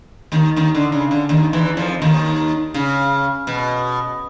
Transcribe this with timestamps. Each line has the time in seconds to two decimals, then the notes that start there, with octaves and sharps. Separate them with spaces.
0.32 D#2 D#3
0.56 D#2 D#3
0.75 D3
0.92 C#3
1.11 D3
1.29 D#2 D#3
1.53 E2 E3
1.77 F2 F3
2.02 D#2 D#3
2.74 C#3
3.47 B2